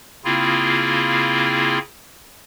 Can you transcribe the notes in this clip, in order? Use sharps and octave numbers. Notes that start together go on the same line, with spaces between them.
C#3 A#3 C4 E4 F4 G#4